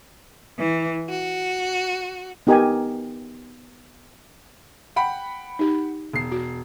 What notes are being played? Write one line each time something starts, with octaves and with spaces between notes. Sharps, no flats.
E3
F#4
B3 D#4 G4 A#4 D#5 G#5
F#5 G5 B5
D#4 G4
E1 C7
F#4